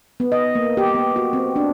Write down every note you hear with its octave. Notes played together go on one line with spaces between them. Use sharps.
B3
D#5
A#3
G4
B3
F#4
C4
D4